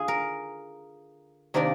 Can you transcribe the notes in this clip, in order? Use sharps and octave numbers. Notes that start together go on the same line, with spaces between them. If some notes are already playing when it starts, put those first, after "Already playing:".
Already playing: D3 F4 G#4
A#4
C3 D#3 A#3 D4 A#4